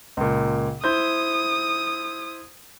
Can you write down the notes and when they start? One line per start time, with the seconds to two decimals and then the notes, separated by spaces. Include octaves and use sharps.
0.17 C#2 A#2
0.84 E4 C5 D#6 G6